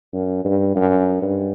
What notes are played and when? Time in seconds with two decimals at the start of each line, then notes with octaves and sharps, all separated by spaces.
0.13 F#2
0.45 G2
0.76 F#2
1.22 G2